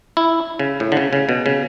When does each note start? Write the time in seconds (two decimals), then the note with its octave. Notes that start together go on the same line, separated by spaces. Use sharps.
0.17 E4
0.59 C#3
0.80 A2
0.92 D3
0.97 C#3
1.13 C#3
1.29 B2
1.46 C#3